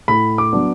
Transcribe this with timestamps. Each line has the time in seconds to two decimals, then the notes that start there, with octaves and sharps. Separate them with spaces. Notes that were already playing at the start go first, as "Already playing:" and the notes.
0.08 A2 B5
0.38 D6
0.53 F#3 B3 D4